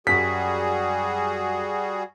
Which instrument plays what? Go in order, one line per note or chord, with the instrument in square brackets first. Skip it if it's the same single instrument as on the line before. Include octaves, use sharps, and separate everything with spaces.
[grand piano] F#2 B6 [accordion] G3 F#4 G#4